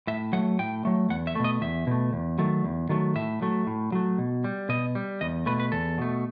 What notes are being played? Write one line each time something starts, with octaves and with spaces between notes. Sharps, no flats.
A2 E5
F#3 A3 F#5
A2 G5
F#3 A3
E2 F#5
E5
B2 A3
D#5
E2 E5
B2 A3
E2
D#3 F#3 A3
E2
D#3 F#3 A3
A2 E5
F#3 A3
A2
F#3 A3
B2
G3
B2 D#5
G3
E2 D#5
B2 A3 B4
B4
E2 A4
B2 A3